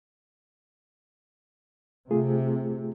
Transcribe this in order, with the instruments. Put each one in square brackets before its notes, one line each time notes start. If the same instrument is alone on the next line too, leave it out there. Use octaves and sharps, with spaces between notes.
[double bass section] C3 [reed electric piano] A3 F4 G#4